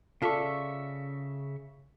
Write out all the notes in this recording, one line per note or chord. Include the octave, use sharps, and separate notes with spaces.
C#3 F4 A4 D5 E5 C#6